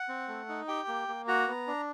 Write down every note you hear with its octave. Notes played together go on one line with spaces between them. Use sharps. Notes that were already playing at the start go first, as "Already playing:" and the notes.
Already playing: F#5
C4
A3
D#4
G4 G5
A#3
A#3
F#4 A#5
B3
D4